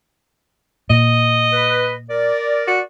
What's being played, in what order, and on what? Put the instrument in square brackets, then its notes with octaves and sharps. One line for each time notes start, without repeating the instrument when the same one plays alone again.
[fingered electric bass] A#2 [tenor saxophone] D#5
[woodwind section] B4
A#4 D5
[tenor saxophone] F#4